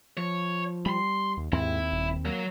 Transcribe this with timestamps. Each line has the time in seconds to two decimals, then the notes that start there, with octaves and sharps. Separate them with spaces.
0.17 F3 C#5
0.86 G3 B5 C6
1.37 D#2
1.52 D#2 G#2 C4 E4
1.92 D#1
2.25 F#3 A#3